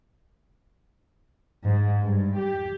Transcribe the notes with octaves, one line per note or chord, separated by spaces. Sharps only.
G#2
G2
G4